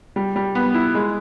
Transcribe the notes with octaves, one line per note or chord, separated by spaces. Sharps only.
G3
G3
B3
E4
G#3